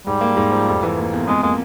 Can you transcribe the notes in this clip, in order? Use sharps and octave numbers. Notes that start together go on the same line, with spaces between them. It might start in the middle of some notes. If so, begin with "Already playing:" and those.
G#2 G3
A#3
G#2
F3
F1
E3
A#3
E2
F2 G#3
G#3 A#3